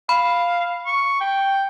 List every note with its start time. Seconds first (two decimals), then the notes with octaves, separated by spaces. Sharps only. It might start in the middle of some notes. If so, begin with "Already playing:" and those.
0.09 F5 B5
0.86 C#6
1.20 G5